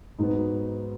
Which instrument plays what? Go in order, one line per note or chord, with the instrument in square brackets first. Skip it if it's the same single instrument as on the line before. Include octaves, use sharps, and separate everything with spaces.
[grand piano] G#2 F#3 B3 [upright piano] D#4